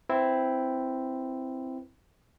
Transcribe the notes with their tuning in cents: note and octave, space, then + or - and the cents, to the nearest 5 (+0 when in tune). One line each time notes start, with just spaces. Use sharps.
C4 -5 E4 +0 B4 -10